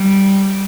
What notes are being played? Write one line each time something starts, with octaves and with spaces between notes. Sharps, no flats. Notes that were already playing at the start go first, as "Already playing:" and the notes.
Already playing: G3